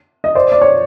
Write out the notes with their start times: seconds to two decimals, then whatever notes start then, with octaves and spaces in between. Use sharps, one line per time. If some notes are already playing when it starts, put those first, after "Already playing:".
0.24 D#5
0.35 C5 D5
0.52 D5
0.61 C#5